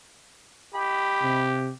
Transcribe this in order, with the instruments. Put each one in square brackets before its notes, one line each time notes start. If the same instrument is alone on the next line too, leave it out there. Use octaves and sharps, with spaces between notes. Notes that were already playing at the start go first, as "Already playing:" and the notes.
[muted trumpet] G4 [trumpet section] D#5 B5
[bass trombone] C3